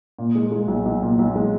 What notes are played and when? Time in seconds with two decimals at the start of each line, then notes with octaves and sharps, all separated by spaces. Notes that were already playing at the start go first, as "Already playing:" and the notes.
0.19 A#2
0.35 G#3
0.52 G#3
0.68 B1
0.85 B1
1.02 A#2
1.19 B1
1.36 G#3